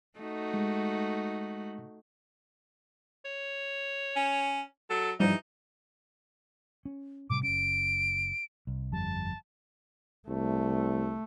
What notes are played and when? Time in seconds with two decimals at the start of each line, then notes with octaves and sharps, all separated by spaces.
0.19 A3 D#4 F#4
0.54 G#3
3.25 C#5
4.16 C#4
4.90 F#3 A4
5.20 G2 E3 F3 G3 D#4
6.85 C#4
7.30 A2 C3 G3 D6
7.43 F#1 C#4 D7
8.67 C2
8.92 G1 F2 G3 A5
10.28 C2 A3